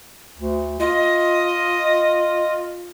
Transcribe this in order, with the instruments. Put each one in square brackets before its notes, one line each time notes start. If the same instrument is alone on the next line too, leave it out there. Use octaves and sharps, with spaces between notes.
[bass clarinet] D2
[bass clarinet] F4 [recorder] D#5